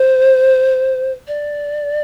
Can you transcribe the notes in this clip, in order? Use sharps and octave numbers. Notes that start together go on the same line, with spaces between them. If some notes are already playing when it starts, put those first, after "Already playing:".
Already playing: C5
D5